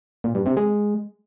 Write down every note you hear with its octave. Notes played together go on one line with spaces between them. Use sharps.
A#2
G2
C3
G#3